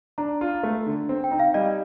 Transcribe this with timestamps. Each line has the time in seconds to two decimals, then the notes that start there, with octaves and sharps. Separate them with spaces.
0.18 D4 A#5
0.41 F4
0.63 A3
0.86 D3
1.09 C4
1.24 G5
1.31 D#4
1.39 F5
1.54 G3 D#5